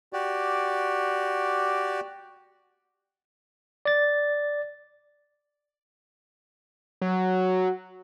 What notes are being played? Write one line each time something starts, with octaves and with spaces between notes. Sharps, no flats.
F#4 G4 D5
D5 A6
F#3